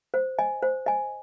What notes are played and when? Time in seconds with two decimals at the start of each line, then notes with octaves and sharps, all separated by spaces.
0.14 C5
0.39 D#5 G#5
0.62 C5
0.86 D#5 G#5